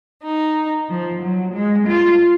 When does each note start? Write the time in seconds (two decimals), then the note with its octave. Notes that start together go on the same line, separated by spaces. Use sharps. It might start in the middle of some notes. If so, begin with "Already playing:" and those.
0.22 D#4
0.89 F3
1.22 F#3
1.53 G#3
1.87 F4